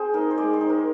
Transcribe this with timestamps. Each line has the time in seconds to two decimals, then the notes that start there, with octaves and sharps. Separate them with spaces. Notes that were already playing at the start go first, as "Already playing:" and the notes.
Already playing: C4 G#4 C5
0.14 D#4 A#4
0.31 C5
0.38 G#3 D5
0.53 C5
0.61 D#4
0.70 A#4